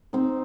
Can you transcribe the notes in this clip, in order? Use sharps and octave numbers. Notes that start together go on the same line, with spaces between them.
C4 D#4